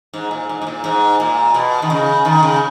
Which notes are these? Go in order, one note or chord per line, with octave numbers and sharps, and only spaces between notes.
G#2
A#2
G#2
G#2
A#2
G#2
A#2
B2
D#3
C#3
D#3
C#3